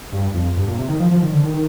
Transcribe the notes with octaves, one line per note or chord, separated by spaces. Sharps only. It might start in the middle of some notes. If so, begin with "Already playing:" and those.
G2
F2
G2
A#2
C3
D#3
F3
F3
D#3
D3
D#3